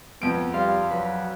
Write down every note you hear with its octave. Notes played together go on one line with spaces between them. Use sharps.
F2 B3 D7
G3 D5 F5 C6
F#3 B4